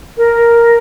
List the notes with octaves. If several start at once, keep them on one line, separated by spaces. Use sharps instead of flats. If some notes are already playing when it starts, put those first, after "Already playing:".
A#4